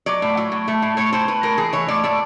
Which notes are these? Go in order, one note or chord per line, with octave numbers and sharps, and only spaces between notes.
F#3 D5
A2
F#3
A2
A3
A2
A2 C#5
A2 C5
A2 B4
A2 A#4
E3 G#4
E3 C#5
A2 D5
A3 D5